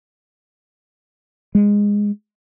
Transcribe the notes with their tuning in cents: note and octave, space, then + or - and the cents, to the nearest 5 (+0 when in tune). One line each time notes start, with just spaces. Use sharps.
G#3 -15